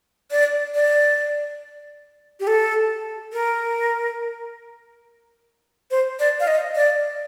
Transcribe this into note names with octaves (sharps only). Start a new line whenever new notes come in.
D5
D5
G4
A4
A#4
C5
D5
F5
D#5
D5